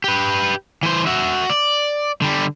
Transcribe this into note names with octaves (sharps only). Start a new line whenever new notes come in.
G4 B4
E3 C5
F#4 E5
D5
D3 G3